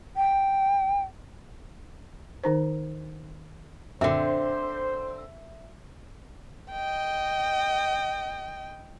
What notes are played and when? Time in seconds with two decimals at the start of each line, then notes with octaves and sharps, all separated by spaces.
0.16 G5
2.44 D#3 D#4 C5
4.01 F#2 A#2 D3 C4 C5 E5
6.71 D#5 G5